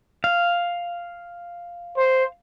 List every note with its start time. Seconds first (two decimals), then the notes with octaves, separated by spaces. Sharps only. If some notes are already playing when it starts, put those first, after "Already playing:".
0.24 F5
1.97 C5